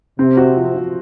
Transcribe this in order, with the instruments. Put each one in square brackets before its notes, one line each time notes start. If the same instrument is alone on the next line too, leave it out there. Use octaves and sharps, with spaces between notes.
[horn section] C3 [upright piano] C4
[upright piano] F#4
F3
F3